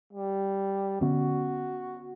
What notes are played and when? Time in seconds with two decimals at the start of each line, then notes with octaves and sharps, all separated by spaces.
0.13 G3
1.01 D3 B3 C#4 F#4